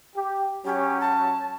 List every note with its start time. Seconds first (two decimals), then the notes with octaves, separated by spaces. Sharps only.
0.16 G4
0.65 F#3 C#4 G4
1.00 A5